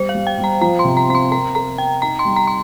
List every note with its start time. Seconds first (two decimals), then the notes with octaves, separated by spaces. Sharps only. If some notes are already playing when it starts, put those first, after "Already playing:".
Already playing: G3 C5
0.09 F5
0.15 G3
0.27 G5
0.38 G3
0.44 A#5
0.61 F3 A#5
0.79 C6
0.85 C3
0.97 A#5
1.09 C4 A#5
1.15 C6
1.31 A#4 A#5
1.55 A#4 A#5
1.78 C4 G5
2.02 D#4 A#5
2.19 C6
2.25 G3
2.36 A#5
2.47 C6